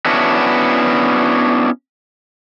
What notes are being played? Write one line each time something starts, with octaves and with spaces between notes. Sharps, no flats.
B3 C#4 D4 E4 F#4